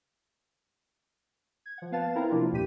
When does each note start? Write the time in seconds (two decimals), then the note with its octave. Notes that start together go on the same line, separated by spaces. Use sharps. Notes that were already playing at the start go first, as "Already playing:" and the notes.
1.66 G#6
1.78 F3 F#5
1.92 B3 B4 F5 A5 A6
2.15 C4 E4 A#4 B4 A#5
2.30 C3 F3 A#3 D4 E4 F4
2.52 G1 E2 A#2 G4 B6 D#7